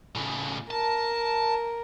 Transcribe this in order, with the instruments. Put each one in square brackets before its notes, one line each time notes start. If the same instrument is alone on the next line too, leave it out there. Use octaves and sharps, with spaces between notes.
[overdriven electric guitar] A2 C#3
[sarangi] A#4 [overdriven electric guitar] A5